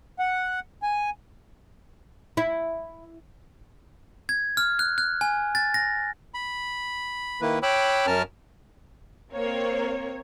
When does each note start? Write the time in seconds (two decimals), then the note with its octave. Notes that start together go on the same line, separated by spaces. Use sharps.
0.19 F#5
0.83 G#5
2.37 E4
4.29 G#6
4.57 F6
4.79 F#6
4.98 F#6
5.21 G#5
5.55 A6
5.74 A#6
6.34 B5
7.41 D#3 A#3 E4 B4
7.63 C#5 G5 B5 D6 E6 F#6
8.07 F#2 C#4 A#4 A5 F6
9.33 A#3 C4 C#5